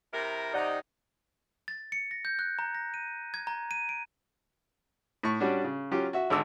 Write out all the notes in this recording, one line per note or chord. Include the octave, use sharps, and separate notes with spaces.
C3 E4 A#4
C3 D#4 D5 F#5
A6
C#7
A#6
G6
F#6
A#5
A#6
D#7
G#6
A#5
D#7
D7
A2 C#6
G3 C#4 D4 F#4
C#3
F#3 C#4 F4 G4
F#4 E5
G#1 D3 D6 E6